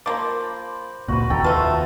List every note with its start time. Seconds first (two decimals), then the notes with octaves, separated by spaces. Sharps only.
0.06 F3 A#3 C5 B5 D6
1.08 C#2 A#2 F#4 B4
1.30 F1 D#2 A4 G5 A#5
1.44 A3 F4 F#4 A4 B4 A5